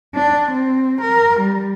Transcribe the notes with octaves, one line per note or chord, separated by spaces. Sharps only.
D4
C4
A#4
G3